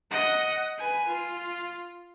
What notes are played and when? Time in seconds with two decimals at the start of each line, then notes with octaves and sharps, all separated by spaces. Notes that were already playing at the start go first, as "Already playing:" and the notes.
0.11 D#5 F#5
0.79 B4 G#5
1.08 F4